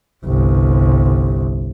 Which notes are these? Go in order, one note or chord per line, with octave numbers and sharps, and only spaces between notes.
G1 C2